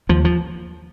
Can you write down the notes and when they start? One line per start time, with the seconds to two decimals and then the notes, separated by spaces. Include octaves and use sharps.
0.09 D#2 F3
0.25 F3